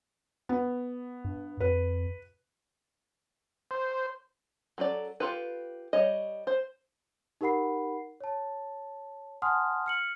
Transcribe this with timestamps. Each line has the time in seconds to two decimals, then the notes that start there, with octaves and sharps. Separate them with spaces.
0.49 B3
1.25 G2
1.60 F2 B4
3.71 C5
4.78 F#3 C#4 A4 D5
5.20 F4 G4 A4 B4
5.93 G3 C#5 D#5
6.47 C5
7.41 D#4 G4 A#4 F#5 B5 C7
8.21 C#5 A5
9.42 F#5 G#5 A5 C6 D#6 F6
9.86 F6 C#7 F#7